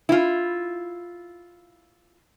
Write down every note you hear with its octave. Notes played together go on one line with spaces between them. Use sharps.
E4 F4